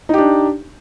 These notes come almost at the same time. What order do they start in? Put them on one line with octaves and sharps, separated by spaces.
D#4 G4 D4